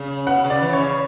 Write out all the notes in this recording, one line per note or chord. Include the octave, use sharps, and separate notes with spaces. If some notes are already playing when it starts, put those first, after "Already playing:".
Already playing: C#3
B2 F#5
C#3
D5
E3
C#5
C#3